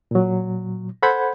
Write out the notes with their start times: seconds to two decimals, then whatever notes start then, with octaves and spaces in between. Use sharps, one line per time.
0.11 A#2 F#3
1.03 A4 C5 F#5 B5 G6 G#6